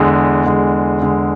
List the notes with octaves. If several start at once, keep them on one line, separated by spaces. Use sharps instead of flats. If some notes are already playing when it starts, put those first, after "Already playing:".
Already playing: E2 D3 G#3
E2 D3 G#3
E2 D3 G#3